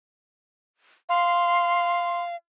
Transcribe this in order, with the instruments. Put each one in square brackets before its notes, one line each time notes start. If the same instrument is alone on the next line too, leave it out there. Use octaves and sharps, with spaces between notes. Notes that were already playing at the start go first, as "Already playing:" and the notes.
[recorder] F5 [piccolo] C6